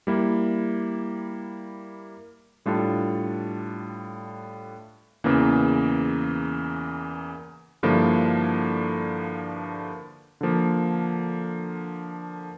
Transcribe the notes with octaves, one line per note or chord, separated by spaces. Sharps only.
G3 A#3 E4
A2 G3 D4 F4 A4
E2 C#3 E3 A#3
G2 D3 F3 A#3 E4
D3 F3 A#3